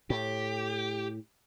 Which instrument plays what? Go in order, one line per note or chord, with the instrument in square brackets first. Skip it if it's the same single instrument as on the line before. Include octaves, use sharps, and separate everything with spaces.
[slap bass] A2 [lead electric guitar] G4